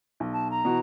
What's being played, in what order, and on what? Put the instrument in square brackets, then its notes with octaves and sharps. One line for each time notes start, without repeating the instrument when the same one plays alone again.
[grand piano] B1
[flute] A5
A#5
[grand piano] B2 E3 F#4